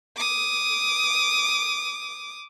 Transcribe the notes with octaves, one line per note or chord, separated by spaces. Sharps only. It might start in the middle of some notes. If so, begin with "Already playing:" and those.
D6 D#6